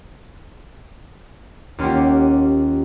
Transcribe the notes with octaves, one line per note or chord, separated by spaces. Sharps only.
D#2 C#4 F4 G4 F#5